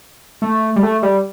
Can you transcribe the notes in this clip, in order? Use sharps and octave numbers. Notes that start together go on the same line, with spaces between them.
A3
G3
A3
G3